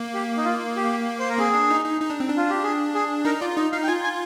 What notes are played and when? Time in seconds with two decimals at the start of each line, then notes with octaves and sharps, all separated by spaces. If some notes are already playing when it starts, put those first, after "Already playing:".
Already playing: A#3
0.14 G4
0.37 D#4
0.45 F4
0.76 G4
1.19 C5
1.29 A#4
1.38 C4 G#4
1.54 D4
1.70 D#4
1.85 D#4
2.01 D#4
2.10 D4
2.20 C4
2.30 D4
2.37 F4
2.50 G4
2.63 G#4
2.94 G#4
3.25 D#4 A#4
3.41 F4 D5
3.57 D#4 D#5
3.72 D#4 F5
3.83 G5
3.88 F4 G#5
4.04 G#5